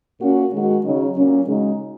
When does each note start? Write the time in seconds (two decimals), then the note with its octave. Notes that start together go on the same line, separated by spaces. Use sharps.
0.20 A#2 A#3 C#4 F#4
0.52 D#3 G#3 F#4
0.84 C#3 F#3 D#4
1.15 A#2 F#3 C#4
1.46 C#3 G#3 D#4 F#4